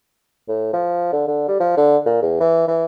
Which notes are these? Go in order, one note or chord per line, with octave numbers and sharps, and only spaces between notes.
A2
F3
D3
D3
G3
F3
D3
A#2
E2
E3
E3